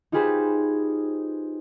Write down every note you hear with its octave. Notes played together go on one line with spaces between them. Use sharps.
D#4 F4 G4 G#4 B4 C5